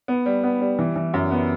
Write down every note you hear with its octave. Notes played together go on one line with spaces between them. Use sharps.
B3
G3
B3
G3
E3
E3
F#2
B3